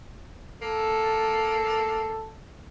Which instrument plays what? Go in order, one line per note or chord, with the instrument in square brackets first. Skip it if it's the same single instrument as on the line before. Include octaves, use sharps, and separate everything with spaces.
[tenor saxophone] A#3 [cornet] A4